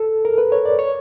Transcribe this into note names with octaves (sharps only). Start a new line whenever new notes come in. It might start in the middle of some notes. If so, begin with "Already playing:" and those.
Already playing: A4
A#4
B4
C#5
D5
C#5